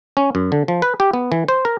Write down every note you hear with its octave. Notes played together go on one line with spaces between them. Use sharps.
C#4
F#2
D3
F3
B4
G4
B3
E3
C5
A#4